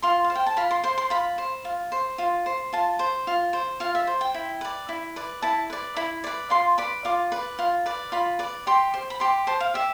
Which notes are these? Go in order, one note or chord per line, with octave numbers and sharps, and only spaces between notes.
F4 C6
F5
C5
G5
A5
F4 B5
C6
C5 C6
C6
F4 B5
C5
F4
C5
F4
C5
F4 A5
C5
F4
C5
F4 F5
E5
C5
G5
E4
B4 D5
E4
B4 D5
E4 A5
B4 D5
E4 B5
B4 D5
F4 C6
B4 D5 B5
F4 D6
B4 D5
F4
B4 D5
F4 B5
B4 D5
G4 C6
C5
B5
G4 C6
C5 A5
F5
G4 E5